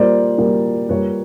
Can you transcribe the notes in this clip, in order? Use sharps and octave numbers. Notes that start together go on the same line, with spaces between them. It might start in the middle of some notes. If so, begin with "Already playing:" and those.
Already playing: A#2 G3 A#3 C5 D5
A#2 G3 A#3
A#2 G3 A#3 B4 C#5